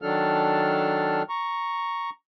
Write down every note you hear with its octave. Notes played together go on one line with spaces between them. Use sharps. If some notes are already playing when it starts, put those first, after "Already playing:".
D#3 F#3 D4 A4 F6
A#5 C#6